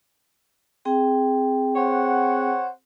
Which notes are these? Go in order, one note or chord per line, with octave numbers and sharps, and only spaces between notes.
C4 G#4 G5
C5 C#5 F#5